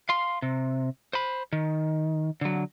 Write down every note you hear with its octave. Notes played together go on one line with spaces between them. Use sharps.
F5 C6
C3
C5 B5
D#3
D3 F#3